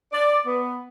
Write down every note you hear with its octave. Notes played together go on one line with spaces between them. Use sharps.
D5
B3